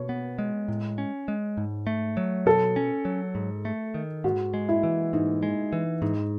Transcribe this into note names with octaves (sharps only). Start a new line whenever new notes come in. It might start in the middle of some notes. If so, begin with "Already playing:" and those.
Already playing: B2 C#5
B3
G#3
A2
C#4
G#3
G#2
A3
F#3
B2 A4
C#4
F#3
G#2
A3
D#3
G#2 F#4
G#3
E4
E3
G#2 D#4
G#3
E3
G#2 D#4